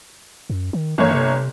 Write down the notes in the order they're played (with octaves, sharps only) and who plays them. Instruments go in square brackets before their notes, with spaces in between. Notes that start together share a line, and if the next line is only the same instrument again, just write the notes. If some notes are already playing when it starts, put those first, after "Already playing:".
[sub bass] F#2
D#3
[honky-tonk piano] G1 A#3 C#5 [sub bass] E3
[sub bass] C3